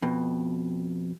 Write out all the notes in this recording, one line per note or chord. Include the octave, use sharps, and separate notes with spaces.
F2 B2